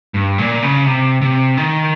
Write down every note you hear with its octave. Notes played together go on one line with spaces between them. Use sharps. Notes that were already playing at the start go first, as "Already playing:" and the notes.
G2
A#2
C#3
C3
C3
D#3